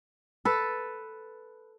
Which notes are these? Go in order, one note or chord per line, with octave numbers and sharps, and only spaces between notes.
A4 B4